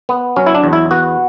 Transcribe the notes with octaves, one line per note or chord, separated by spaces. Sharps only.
B3
F#3 C#4
E4
D4
E2
E4
B3 F#4